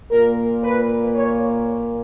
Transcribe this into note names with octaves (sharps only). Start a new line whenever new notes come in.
A#2 A#3 A#4
B4
C#5